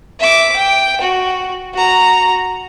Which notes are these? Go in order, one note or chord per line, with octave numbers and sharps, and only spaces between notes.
E5 D6
G5
F#4
F#4 A#5